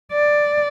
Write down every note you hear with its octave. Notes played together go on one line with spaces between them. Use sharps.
D5